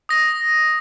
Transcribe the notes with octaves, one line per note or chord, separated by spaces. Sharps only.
D#6 A#6